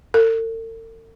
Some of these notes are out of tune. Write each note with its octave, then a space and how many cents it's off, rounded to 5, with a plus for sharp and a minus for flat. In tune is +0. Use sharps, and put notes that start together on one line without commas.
A4 +45